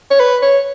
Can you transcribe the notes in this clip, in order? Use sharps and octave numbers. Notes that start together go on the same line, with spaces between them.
C#5
B4
C#5